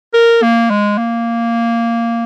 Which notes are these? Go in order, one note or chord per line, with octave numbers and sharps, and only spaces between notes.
A#4
A#3
G#3
A#3